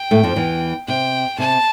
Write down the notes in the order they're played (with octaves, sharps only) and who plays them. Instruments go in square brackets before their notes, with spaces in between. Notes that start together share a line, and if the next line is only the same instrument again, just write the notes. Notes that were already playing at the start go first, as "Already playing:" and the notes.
Already playing: [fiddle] G5
[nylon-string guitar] A2 A3
F2 F3
E2 E3
[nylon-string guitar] C3 [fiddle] G5
[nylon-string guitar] C3 [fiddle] A5